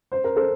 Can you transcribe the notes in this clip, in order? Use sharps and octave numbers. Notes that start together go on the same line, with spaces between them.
C5
A#4
A4 C5